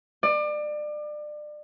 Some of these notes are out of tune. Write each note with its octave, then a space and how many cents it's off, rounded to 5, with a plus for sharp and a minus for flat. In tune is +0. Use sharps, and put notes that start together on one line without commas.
D5 +30